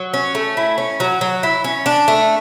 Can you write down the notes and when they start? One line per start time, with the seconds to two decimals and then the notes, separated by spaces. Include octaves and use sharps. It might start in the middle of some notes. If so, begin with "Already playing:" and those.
Already playing: F#3
0.14 C#4
0.35 A3
0.57 E4
0.78 C#4
1.00 F#3
1.21 F#3
1.43 E4
1.64 C#4
1.86 D4
2.08 A3